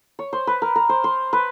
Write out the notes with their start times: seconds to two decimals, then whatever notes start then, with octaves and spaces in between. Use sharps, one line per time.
0.19 C#5
0.33 C5
0.47 B4
0.62 A#4
0.76 A#4
0.89 C5
1.04 C5
1.33 B4